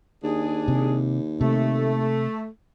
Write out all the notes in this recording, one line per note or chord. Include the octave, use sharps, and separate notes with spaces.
D#2 D4 G#4
C3
C3 A3